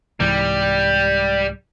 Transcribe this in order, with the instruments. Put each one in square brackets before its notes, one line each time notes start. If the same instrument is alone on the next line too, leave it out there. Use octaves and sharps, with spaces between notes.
[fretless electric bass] C2 G#2 E3 [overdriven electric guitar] G3